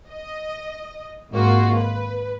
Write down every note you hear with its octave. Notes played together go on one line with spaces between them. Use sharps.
D#5
G#1 G#2 A#3 F4 F#4
B4